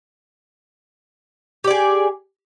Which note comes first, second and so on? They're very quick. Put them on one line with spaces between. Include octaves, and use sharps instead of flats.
G4 D5 G#4